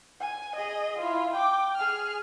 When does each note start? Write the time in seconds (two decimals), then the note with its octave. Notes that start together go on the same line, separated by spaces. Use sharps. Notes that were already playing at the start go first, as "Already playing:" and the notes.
0.20 G#5
0.56 G#4 D#5
0.98 E4 F4
1.34 G5 D6
1.76 G#4 F6